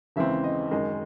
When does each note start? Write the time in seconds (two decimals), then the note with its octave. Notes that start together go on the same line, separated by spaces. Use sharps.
0.16 D#2 C#3 E3 G#3 C4 E5
0.44 D#5
0.71 F#2 D#3 G#3 D#5